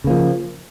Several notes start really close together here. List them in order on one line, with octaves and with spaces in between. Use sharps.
C#3 A#3 F3